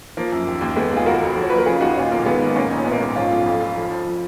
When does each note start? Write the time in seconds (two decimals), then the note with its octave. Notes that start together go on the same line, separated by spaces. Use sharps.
0.17 F3 A#3
0.32 F#2
0.47 D#2
0.61 D#2
0.76 D#2 G#3 B3
0.91 D#2
0.96 F4 G#4
1.06 F1 F#4 A#4
1.21 F2
1.36 F3
1.42 C#5
1.50 F#1 B4
1.58 A#4
1.66 C#3 F4 G#4
1.81 D#2 D#4 F#4
1.91 F#4
1.96 A#2 C#4 F4
2.11 B1 A#3
2.26 D#3 G#3 B3
2.41 G#1 A#3
2.56 A#1 A#3 C#4
2.71 A#2 D#4
2.78 C#4
2.85 A#1 B3
2.92 A#3 C#4
3.01 G#2
3.16 F3 C#4 F4
3.31 B1
3.46 F2
3.61 F1
3.76 F3
3.90 F3